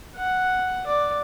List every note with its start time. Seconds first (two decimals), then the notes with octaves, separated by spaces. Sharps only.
0.16 F#5
0.87 D5